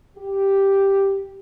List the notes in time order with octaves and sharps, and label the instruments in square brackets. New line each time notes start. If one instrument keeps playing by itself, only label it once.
[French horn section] G4